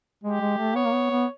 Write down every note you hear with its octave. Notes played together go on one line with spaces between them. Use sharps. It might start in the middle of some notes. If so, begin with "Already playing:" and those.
G#3 G4
G#3
A3
B3 C#5
A#3
B3
B3